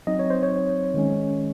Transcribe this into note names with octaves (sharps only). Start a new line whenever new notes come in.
F#3 C4 D#4 D#5
C#5
C5
C#5
D#3 G#3 C#4